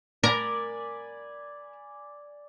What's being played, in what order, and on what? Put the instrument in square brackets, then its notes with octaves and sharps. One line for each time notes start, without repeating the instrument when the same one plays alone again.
[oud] A#4 [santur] D5 G#5 B5